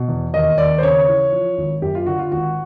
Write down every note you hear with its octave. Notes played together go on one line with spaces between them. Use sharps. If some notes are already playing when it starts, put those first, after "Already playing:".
Already playing: B2
E2
D#2 D#5
D#2 D5
C5
C#3 C#5
E3
F3
G#1
F#2 G4
F4
D3 F#4
F4
G#1 F#4